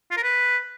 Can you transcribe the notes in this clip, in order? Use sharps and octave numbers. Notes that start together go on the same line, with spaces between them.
F4
A#4
B4